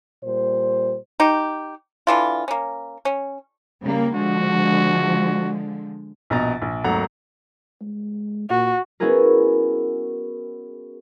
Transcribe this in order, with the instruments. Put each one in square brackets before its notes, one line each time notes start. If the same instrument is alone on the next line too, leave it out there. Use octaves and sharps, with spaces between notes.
[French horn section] A#2 G3 C5
[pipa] D#4 G4
D3 E3 F4
A#3 C#4
C#4
[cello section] C#3 G3 A#3
[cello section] D3 F3 G#3 [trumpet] F#4
[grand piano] A#1 B2 D#5 A#5 A6
A#1
G#1 D#2 F#3 A3 F#5 A#5
[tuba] G#3
[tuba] A#2 [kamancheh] F#4
[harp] B3 C#4 E4 F#4 G#4 A#4